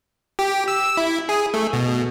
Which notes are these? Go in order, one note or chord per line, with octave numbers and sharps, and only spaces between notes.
G4
E6
E4
G#4
A3
B2